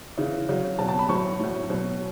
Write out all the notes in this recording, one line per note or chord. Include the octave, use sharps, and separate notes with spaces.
C#3 E3
C#3 F#3
B2 F#3 A5
A5
B5
A2 F#3 C#6
A2 F#3
B2 F#3